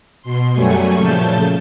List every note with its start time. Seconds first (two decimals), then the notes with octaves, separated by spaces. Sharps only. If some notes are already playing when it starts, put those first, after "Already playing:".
0.22 B2 C6
0.53 F#2 F#3 G3 A3 G#5 C#6
0.96 A#2 C#3 F3 A3 A5 G6